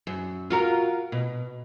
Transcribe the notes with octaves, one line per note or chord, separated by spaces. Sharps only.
F#2
F4 F#4 A#4
B2